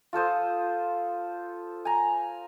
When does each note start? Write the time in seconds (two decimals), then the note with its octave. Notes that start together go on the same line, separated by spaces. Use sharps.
0.13 F4 A4 C5 D#6
1.85 G#5 A#5